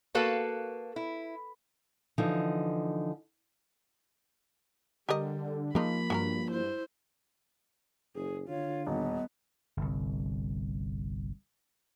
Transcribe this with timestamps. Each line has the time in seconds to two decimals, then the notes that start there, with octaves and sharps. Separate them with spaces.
0.15 A#3 F#4 A4 B4 F5 A5
0.96 E4
2.18 D3 E3 F3 D#4
5.09 D3 G3 G4 A#4 D#5
5.75 F3 G#3 A#3 D#4 F4 B5
6.10 G2 F#3 A4 A#4
6.48 E4 C5
8.16 F#1 G#4
8.49 D3 F4 C#5
8.87 D#1 B3 D#5
9.77 G1 C2